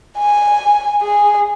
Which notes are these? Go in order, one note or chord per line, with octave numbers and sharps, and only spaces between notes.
G#5
G#4